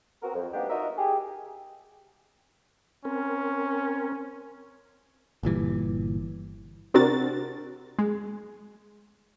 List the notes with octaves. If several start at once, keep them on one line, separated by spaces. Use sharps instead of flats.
B3 C4 F#4 A#4
F2
G3 A#3 B3 D4 D#4 G4
D#4 F4 F#4 A#4 D#5 E5
G4 G#4
C4 C#4 A#4
G1 A#2 E3 G3
C3 C4 D4 F#4 A#4 A6
G#3